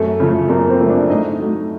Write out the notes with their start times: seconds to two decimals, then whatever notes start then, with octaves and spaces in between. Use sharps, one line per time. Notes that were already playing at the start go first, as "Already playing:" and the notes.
Already playing: F#2 A3 A4
0.20 C#3 F3 A3
0.50 F#2 A#3 A#4
0.69 C4 C5
0.80 C#3 F3 A3
0.89 D4 D5
1.10 A2 D#4 D#5
1.40 F#3 A3